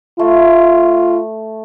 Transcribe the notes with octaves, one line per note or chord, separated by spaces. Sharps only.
A3 F4